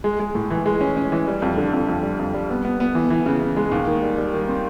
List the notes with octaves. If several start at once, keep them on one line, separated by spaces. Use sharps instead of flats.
G#3
G#3
A2
E3
G#3
C#4
C#4
E3
G3
F2
D3
F2
F2
G3
F2
G3
B3
B3
B3
E3
E3
C#3
C#3
G#3
D#2
D#3
G3
G3
D#3
C4